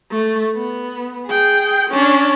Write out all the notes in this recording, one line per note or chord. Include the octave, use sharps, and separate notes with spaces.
A3
B3
G#4 G5
C#4 D4